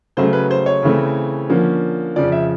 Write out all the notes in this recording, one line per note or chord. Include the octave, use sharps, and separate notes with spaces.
C#3 F#3 A3 C#4 C5
B4
C5
C#5
C#3 E3 A3 C4
D3 F3 A#3 C#4
F2 C#3 F3 D5
E5